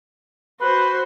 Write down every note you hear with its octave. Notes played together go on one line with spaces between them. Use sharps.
F#4 B4 C5